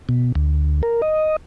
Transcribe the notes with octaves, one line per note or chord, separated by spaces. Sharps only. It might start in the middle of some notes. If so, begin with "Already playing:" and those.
B2
D2
A#4
D#5